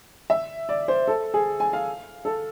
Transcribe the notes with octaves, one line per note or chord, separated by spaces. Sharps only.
E5
D5
C5
A4
G#4
G#5
F5
A4